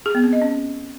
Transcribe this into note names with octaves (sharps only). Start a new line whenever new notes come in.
G#4
B3
C4
D#5
C#4